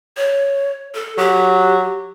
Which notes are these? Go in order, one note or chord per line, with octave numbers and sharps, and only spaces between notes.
C#5
A4
F#3 G4